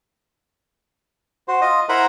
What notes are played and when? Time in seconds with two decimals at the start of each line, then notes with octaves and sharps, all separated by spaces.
1.48 F#4 C5
1.61 F4 D#5
1.89 E4 A#4 C5 F#5 A#5 B5